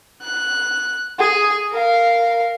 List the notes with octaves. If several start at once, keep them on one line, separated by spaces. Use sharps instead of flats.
F#6
G#4
A#4 F5